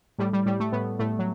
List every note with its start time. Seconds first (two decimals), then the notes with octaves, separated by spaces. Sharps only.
0.18 A2 G3
0.33 G3
0.46 A2 G3
0.60 A3
0.72 A2 B3
0.99 A2 A3
1.19 F#3